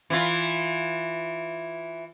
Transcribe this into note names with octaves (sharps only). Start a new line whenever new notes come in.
E3 F4